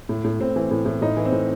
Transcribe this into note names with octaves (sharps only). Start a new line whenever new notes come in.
A2
A2
A2 C4
E3
A2
A2
A2 D#4
E3
C4
A2